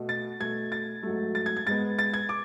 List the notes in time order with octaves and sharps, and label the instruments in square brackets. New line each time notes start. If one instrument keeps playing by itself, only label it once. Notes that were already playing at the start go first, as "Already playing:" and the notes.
Already playing: [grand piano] B2 A3
A6
B2 A3 G#6
A6
G#2 F#3 A3
A6
G#6
G#6
G#2 G#3 B3 A6
A6
G#6
D6